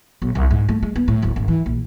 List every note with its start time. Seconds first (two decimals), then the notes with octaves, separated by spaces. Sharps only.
0.22 B1
0.35 C2
0.51 G#2
0.69 A3
0.83 G#3
0.96 B3
1.08 A2
1.22 D1
1.36 G#1
1.48 E3
1.66 A#1